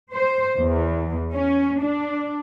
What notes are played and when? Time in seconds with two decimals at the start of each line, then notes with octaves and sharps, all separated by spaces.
0.12 C5
0.59 E2
1.33 C#4
1.82 D4